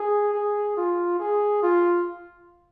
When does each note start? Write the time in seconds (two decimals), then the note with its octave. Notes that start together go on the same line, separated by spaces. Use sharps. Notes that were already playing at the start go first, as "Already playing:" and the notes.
Already playing: G#4
0.33 G#4
0.77 F4
1.20 G#4
1.63 F4